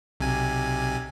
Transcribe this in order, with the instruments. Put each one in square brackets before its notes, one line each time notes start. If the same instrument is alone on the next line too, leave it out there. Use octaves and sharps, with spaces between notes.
[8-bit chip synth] B1 C3 G#5